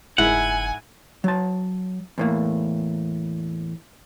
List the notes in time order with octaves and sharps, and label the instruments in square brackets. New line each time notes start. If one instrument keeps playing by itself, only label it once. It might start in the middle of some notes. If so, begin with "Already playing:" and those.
[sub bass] F#1 [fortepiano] G#2 E4 [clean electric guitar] F#5 [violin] G#5
[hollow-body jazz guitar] F#3 A5
E2 A2 A#3